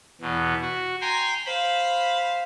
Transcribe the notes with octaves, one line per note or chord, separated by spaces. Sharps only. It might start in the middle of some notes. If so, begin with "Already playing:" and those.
E2 B2
F#4
G5 G#5 A#5 C6
C5 F5 B5